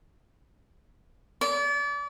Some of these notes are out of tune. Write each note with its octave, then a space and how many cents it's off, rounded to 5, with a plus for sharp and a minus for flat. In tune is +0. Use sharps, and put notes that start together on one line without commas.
D5 -35